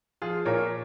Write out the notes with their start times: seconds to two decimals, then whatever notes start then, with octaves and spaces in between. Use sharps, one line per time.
0.22 F3 F4 G#4
0.45 A#2 A#4 C#5